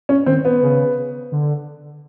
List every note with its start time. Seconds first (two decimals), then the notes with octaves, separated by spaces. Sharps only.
0.09 C#4
0.26 D#3 C4
0.45 B3
0.62 C#3
1.32 D3